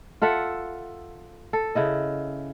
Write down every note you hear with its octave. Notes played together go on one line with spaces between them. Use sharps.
F4 A4 E5 F#5
A4
C#3 E4 D#5